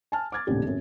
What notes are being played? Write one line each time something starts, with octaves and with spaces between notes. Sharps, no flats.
G#5 A5 F6
D6 F6 G#6 A6
D#1 A1 F2 C#3 D4 G4
G#1 F#2